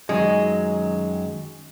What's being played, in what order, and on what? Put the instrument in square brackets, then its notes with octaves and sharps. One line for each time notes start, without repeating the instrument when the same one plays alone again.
[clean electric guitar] F#2 D#3 F#3 [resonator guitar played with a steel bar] G#3